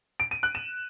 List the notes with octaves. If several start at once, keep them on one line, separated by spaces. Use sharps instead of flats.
D7
D#7
F#6
E7